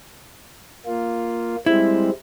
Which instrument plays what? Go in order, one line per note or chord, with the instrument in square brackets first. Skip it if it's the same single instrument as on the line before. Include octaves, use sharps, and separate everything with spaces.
[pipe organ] A#3 F4
[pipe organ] G3 G#3 C4 [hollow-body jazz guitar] E4